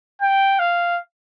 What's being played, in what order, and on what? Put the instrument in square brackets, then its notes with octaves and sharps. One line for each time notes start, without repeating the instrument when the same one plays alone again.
[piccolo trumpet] G5
F5